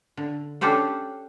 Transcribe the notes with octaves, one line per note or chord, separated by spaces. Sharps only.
D3
C#4 D4 G4 A4 C5 F#5